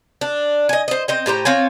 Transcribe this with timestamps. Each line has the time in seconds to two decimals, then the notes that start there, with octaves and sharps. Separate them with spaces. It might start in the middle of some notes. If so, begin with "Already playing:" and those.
0.21 D4
0.69 D#5 G#5
0.88 C5 D#5
1.08 C4 D#5 G5
1.26 A2 G4 C5 A#5
1.45 C4 F4 C#5 G#5